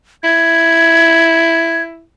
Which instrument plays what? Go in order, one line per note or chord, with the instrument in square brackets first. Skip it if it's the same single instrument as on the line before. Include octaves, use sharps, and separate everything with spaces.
[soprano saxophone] E4 [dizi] G#6